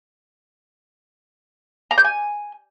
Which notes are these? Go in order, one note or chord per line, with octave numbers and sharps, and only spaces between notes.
A#5
G6
G#5